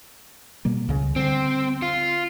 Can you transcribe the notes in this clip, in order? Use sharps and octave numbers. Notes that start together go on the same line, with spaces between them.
B2 G3 A#3
C#2 C#3
D3 G3 C4
F4